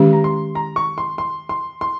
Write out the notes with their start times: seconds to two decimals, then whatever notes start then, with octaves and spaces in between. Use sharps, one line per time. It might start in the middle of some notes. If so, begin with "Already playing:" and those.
Already playing: D#3 G#3 C#4 G4
0.13 A#5
0.24 C6
0.55 A#5
0.76 C#6
0.98 C6
1.18 C6
1.49 C6
1.81 C6